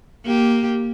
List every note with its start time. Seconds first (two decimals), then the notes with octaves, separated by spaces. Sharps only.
0.25 A#3 G4